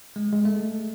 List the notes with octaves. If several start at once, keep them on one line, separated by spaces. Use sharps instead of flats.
G#3
G#3
A3